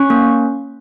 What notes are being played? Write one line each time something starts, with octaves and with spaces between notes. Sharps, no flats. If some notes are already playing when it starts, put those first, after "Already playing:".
Already playing: C#4 C#6
A#3